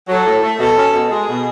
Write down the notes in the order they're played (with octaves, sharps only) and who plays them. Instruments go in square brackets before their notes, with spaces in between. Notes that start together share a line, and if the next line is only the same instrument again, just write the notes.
[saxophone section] F#3 [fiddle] A4
[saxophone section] A2
A3
[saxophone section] B2 [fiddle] A4
[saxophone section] C#4
B2
[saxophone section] G#3 [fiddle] G#4
[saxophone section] B2